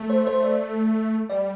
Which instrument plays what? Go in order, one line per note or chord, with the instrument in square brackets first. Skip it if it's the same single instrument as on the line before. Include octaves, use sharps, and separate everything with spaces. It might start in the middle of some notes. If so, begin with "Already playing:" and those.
Already playing: [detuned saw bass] A3
[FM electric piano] C5
C5
D5
[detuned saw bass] G3 [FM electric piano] D5